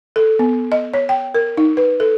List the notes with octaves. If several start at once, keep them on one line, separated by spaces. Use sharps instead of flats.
A4
B3
D#5
C#5
G5
A#4
D#4
B4
A4